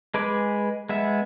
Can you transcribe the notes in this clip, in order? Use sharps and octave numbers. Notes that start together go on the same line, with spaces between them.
G#3 G#4 B4 D6
G#3 B3 E5